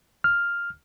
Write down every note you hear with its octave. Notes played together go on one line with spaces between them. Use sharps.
F6